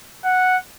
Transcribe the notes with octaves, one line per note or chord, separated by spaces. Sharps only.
F#5